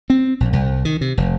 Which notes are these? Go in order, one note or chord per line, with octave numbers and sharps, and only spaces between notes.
C4
A#1
C2
D#3
C3
F1